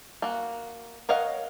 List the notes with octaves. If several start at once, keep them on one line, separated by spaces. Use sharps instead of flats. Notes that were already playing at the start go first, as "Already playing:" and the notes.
A#3 F#4
A#4 C#5 D#5 F5 F#5